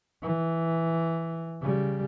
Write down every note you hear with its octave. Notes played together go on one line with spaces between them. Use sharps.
E3
C#3 G3